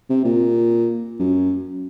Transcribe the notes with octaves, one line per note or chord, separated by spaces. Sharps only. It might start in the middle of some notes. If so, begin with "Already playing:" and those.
C3
A#2
F#2